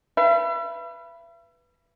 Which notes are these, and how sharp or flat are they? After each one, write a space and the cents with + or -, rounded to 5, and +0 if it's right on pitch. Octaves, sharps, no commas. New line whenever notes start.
B4 -5 E5 +40